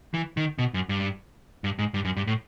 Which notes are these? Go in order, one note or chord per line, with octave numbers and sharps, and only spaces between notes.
E3
D#3
B2
F#2
G2
G2
G#2
G2
F#2
G2
A2